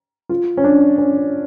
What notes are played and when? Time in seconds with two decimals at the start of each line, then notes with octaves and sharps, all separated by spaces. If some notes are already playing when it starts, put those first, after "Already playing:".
0.29 F4
0.57 C#4
0.64 D4
0.98 C#4